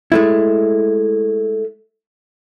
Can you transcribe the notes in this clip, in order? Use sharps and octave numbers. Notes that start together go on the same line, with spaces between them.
G#3 A3 E4